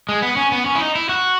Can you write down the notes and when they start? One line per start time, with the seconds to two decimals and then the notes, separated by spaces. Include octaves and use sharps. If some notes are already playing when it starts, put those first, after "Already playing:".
0.09 G#3
0.22 B3
0.37 C#4
0.52 B3
0.66 C#4
0.75 E4
0.81 D#4
0.95 E4
1.09 F#4